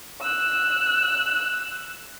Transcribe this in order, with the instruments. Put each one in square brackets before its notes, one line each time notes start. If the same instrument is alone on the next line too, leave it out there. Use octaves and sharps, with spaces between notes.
[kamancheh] E6 F#6